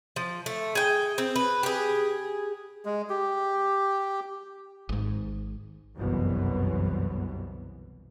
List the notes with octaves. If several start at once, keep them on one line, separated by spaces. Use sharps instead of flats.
F3
A3
G#4 G5
C4
B4
G4 G#4
G#3
G4
G#1 G#2
G1 C2 F#2 B2 E3